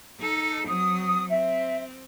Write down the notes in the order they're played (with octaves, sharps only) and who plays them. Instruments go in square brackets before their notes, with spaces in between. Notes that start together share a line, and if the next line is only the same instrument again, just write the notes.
[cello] D#4 A4
[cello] F#3 C4 [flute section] D#6
[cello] C4 [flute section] E5